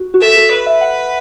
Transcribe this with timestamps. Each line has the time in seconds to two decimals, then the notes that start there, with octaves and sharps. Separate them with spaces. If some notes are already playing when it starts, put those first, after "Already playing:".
Already playing: F#4
0.14 F#4
0.21 A4 E5
0.36 A4
0.52 B4
0.66 E5
0.81 F#5